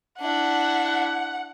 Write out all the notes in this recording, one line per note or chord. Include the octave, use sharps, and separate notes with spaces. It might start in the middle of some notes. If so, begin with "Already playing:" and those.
D4 E4 F#5